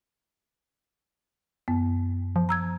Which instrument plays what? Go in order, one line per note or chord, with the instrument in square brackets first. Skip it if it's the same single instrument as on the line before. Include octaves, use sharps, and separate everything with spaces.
[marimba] F#2 B3
[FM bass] F3
[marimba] A#5 E6 G#6